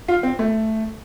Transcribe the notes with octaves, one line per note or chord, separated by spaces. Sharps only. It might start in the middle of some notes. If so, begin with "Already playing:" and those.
F4
C4
A3